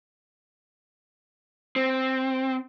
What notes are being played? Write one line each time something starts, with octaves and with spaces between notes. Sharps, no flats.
C4